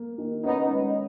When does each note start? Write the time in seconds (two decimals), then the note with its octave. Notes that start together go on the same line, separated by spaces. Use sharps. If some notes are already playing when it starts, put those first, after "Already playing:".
Already playing: A#3
0.18 D#3
0.44 B3 C#4 D#4
0.69 G#3